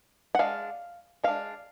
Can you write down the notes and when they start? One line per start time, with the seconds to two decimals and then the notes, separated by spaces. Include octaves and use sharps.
0.35 F#5
0.39 G#3 D4 F5
1.24 G#3 D4 F5